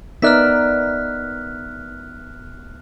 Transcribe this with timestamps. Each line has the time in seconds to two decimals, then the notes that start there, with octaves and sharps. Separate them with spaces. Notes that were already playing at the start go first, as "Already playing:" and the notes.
0.22 B3 D#4 A#4 D5 E5 F6 F#6 B6